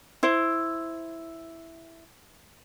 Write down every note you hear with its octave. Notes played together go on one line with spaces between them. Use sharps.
E4 C5